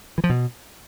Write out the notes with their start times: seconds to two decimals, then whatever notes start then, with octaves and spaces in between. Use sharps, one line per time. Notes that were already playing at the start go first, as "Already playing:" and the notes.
0.18 E3
0.24 F3
0.30 B2